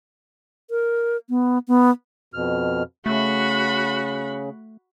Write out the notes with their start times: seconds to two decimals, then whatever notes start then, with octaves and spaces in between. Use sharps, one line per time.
0.70 A#4
1.29 B3
1.68 B3
2.34 F2 B2 F6
3.06 C#3 A3 F#4 B5